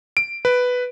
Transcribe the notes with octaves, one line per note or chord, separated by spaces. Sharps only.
D7
B4